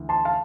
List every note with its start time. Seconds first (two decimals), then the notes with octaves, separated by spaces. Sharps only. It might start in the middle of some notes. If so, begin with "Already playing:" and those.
Already playing: D2 E3
0.09 A5 C6
0.25 F5 A5